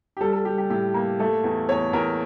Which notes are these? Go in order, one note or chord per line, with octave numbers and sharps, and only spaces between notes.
G4
G3 A4
A4
G3 G4
G4
A2 G4
A#3
A3 A4
E2
E2 C#5
E2 A#4